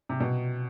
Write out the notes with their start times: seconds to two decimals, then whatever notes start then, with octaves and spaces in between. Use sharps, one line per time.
0.09 C3
0.20 B2